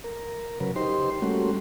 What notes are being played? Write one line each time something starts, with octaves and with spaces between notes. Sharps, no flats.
A#4
C#3 F#3 A#4 B4
D#4 G4 C5 C6
G3 A3 A#3 C#4 F#4